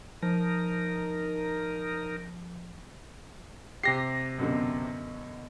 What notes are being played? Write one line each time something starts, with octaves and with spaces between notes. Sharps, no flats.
F3 D#4 A#4
C3 G4 A#6 C7
F#2 B2 D3